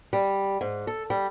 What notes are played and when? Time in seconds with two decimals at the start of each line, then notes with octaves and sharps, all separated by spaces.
0.13 G3
0.61 G#2
0.87 A4
1.10 G3